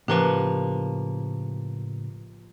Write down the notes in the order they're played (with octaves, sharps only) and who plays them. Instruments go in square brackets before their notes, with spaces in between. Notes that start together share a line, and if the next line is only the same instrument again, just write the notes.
[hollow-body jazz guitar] A2 C#3 [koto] F3 A#3 F#5 [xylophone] G4 A#4 B4